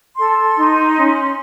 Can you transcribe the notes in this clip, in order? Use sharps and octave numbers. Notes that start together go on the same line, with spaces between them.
A4 C6
D#4
C#4